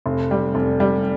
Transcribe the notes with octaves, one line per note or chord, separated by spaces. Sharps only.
F1
G3
F1
G3